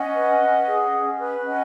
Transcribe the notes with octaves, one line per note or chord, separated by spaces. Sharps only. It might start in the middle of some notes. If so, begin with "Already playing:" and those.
Already playing: C#4 D#5 F#5
B4
C#4
G#4
C#4
B4
C#4 D#5 F#5